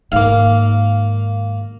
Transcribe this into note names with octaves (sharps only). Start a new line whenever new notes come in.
G#2 D#3 A#3 F5